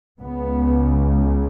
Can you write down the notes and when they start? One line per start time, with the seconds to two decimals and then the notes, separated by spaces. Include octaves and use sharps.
0.21 C#2 C#3 B3